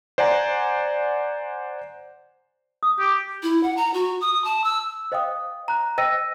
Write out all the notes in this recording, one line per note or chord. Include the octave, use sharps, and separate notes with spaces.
C5 D5 F#5 G#5 A#5
D#6
G4
E4
F#5
A#5
F#4
D#6
A5
E6
C5 D#5 F5 G5 D#6
A#5 F#6
C5 D#5 G5 E6 A#6 D#7